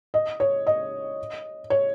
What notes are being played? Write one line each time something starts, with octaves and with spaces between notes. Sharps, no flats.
D#5
C#5
D#5
C#5